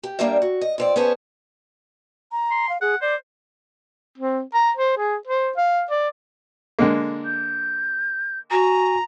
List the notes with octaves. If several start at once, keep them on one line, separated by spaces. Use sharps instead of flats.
G4
G3 A#3 D4 G4 A#4 E5
F#4
D#5
F2 C4 D5
B3 C#4 G#4 C5 G#5 A5
A#5
C6
F5
G#4 F#5
C5 D5
C4
A#5
C5
G#4
C5
F5
D5
D3 G#3 A#3
G6
F#4 G#5 A#5